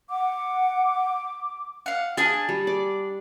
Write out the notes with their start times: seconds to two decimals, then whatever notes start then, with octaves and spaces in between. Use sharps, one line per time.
0.10 F#5 D6
1.86 F5 F#5
2.17 D4 G#4 G#5 A5
2.49 G3
2.67 D5